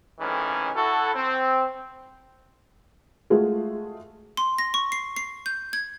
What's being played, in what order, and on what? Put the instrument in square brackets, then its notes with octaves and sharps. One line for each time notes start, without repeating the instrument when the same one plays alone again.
[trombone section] F2 A2 D#3 E3 G#3 C#4
E4 F#4 A4
C4
[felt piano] G#3 A3 F4 F#4 G#4
[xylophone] C6
A#6
C#6
C7
C7
G6
G#6